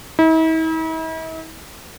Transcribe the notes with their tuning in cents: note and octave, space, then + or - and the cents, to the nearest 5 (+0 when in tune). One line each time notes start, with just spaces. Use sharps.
E4 -45